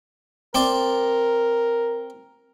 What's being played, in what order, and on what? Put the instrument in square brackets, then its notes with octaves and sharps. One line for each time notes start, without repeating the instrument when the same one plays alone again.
[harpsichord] C4 D5 [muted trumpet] A#4